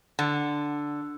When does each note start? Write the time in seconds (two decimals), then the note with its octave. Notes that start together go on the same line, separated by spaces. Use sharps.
0.19 D3